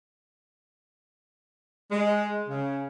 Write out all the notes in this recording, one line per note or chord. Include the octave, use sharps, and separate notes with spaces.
G#3
C#3